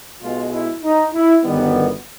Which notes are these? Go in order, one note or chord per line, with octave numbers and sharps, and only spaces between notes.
B1 B2 G#3 F4
E4
D#4
E4
G1 F#2 D#3 G3 B3